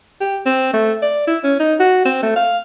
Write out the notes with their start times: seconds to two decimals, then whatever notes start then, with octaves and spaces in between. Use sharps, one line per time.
0.21 G4
0.46 C4
0.73 A3
1.02 D5
1.27 E4
1.44 C#4
1.60 D#4
1.80 F#4
2.05 C4
2.23 A3
2.36 F5